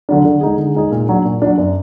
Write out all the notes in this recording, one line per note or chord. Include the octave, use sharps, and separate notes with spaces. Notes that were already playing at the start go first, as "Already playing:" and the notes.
D3 F#3 D4
D3
G#3 D#4 G#4
D3
G#3 D#4 G#4
A#2
F#3 D4
A#2
F#3 D4
F#2